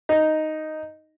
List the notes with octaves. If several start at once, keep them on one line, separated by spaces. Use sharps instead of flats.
D#4